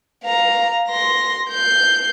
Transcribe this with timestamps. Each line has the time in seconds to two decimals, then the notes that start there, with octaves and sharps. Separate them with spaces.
0.25 F5 A#5
0.89 C6 A#6
1.50 G6 C7